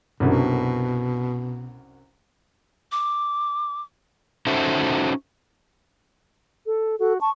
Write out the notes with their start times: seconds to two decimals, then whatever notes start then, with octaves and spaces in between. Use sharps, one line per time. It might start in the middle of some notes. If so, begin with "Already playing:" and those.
0.20 C2 F#2 B2 D3
2.92 D6
4.47 C#4 D#4 F#4 A4 C5 E5
6.66 A4
7.00 F#4 A4
7.21 A5 C#6